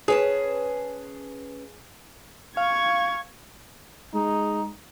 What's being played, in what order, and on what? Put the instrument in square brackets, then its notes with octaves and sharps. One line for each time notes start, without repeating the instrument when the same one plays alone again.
[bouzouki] C#4 B4 A5 [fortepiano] G#4
[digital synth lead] F5 [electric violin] C#6 G#6
[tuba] G#3 [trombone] D#4